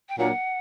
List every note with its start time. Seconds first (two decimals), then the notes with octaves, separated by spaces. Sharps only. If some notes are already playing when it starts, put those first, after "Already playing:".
0.09 G5
0.18 A#2 F#3 A#3 D4 F#5